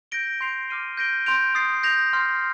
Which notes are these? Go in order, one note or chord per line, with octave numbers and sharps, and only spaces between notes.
G6 A#6 D7 G7
C6 G6 C7 F7
D6 F6 C7 D#7 G7
G6 A#6 D7 G7
C6 G6 D7 F7
D#6 A6 C7
G6 A#6 F7
C6 F6 C7